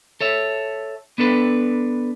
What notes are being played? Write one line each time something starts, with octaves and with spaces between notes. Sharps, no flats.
A4 C#5 E5
B3 D4 A4 B4